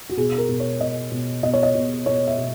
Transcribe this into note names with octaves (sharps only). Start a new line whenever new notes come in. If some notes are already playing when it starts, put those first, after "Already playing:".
F#4
B2 G#4
A#4
B2
C#5
B2 D#5
B2
B2 D#5
C#5
D#5
B2
B2 C#5
E5
B2